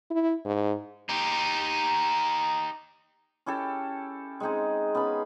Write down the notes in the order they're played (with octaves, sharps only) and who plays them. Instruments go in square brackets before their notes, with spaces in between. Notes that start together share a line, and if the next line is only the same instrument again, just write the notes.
[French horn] E4
G#2
[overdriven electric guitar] D#4 G4
[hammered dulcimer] C#4 E4 G4 A4
G#3 C4 D#4 G#4
B3 C#4 F5 B5